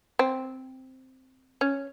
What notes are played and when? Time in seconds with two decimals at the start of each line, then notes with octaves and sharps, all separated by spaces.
0.19 C4
1.61 C#4